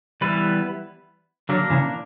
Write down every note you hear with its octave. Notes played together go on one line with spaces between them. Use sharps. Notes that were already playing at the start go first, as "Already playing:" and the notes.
E3 G3 B3 E4 B4
D3 F#3 A#3 D4 A#4
C#3 E3